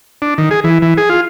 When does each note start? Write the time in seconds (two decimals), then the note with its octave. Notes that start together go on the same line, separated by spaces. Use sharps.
0.22 D4
0.38 D#3
0.51 G#4
0.64 E3
0.82 E3
0.97 G#4
1.10 F4